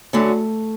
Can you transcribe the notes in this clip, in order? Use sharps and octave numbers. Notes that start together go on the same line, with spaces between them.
D2 D3 F#3 A3 C#4